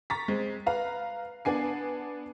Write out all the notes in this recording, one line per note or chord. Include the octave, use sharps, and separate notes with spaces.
A#5 C#6 A6 B6
G#3 C4
B4 F5 A#5
B3 D4 G#5 C7